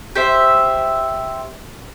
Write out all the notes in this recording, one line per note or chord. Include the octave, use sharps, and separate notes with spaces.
G4 C5 E5